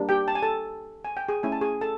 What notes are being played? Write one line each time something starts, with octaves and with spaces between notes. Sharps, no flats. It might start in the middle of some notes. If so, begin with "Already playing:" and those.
Already playing: G3 A#3 D4
G4 G5
A5
G#5
A4 A5
G#5
G5
G#4 G#5
A3 C#4 E4 G#5
A5
G#4 G#5
A4 A5